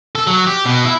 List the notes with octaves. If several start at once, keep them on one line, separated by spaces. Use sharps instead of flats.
A4
F#3
G4
B2
E4